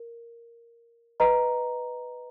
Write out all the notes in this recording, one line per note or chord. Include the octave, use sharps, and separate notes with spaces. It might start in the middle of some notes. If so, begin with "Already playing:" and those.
Already playing: A#4
B4 D#5 A#5